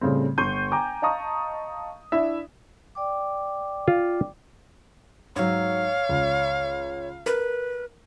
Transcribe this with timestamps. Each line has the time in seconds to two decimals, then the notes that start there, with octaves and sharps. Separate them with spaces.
0.01 A2 C#3 G3 C4
0.38 G1 C6 C#6 G6 D#7
0.72 G5 G#5 A#5 D6
1.02 D#5 F5 A5 A#5 C#6 D#6
2.12 D4 E4 E5
2.95 D5 G5 D6
3.88 F4
5.36 G#2 F#3 C#5 F5
6.09 C#2
7.26 A#4 B4